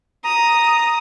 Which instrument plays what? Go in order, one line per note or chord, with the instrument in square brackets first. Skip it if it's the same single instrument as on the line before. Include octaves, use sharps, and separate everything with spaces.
[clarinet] A#5 [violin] D#6